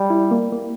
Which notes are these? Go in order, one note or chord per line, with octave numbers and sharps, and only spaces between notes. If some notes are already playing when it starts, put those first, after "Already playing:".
Already playing: G3
E4
A#3
A#3